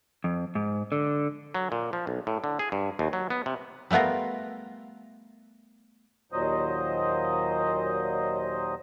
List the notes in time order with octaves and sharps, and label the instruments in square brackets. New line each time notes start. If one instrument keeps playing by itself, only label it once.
[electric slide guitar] F2
G#2
D3
[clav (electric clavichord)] F#3
A#2
F3
B1
A2
D3
G#4
G2
D#2
F#3
B3
C3
[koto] G3 A3 B3 F4 A#4
[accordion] D#2 A#2 F#3 C5 D#5